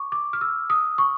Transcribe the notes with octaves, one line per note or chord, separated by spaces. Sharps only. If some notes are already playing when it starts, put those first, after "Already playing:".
Already playing: C#6 D6
D6
F6
E6
D#6
C#6